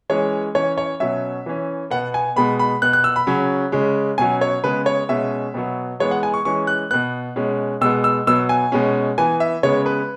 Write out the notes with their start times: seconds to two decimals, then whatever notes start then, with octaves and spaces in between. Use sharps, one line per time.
0.10 E3 G#3 C#4 C#5
0.55 E3 C#4 C#5
0.78 C#5
1.00 B2 F#3 C#4 E5
1.46 E3 C#4
1.91 B2 B3 F#5
2.14 G#5
2.36 B2 G#3 B3 B5
2.59 B5
2.82 B2 B3 F#6
2.93 F#6
3.04 E6
3.16 B5
3.27 C#3 F#3 C#4
3.72 C#3 G#3 C#4
4.18 B2 F#3 C#4 G#5
4.41 C#5
4.64 C#3 G#3 B3 B4
4.86 C#5
5.09 B2 G#3 C#4 E5
5.54 B2 F#3 B3
6.00 E3 G#3 B3 C#5
6.11 F#5
6.23 G#5
6.34 C#6
6.45 E3 G#3 C#4 C#6
6.67 F#6
6.91 B2 B3 F#6
7.36 B2 G#3 C#4
7.81 B2 G#3 B3 E6
8.04 E6
8.27 B2 F#3 B3 E6
8.49 G#5
8.72 B2 G#3 C#4
9.18 E3 B3 G#5
9.40 E5
9.63 C#3 G#3 B3 C#5
9.86 B4